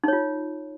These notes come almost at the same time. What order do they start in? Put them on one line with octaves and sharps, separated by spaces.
D#4 C#5 F4